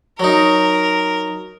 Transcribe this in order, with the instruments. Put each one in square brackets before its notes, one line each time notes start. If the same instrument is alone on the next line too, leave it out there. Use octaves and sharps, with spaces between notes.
[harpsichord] F#3 D#4 [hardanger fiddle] A#4